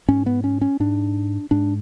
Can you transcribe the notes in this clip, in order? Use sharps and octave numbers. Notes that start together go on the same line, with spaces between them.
G#2 C#4
B3
C#4
C#4
G#2 D4
G#2 D4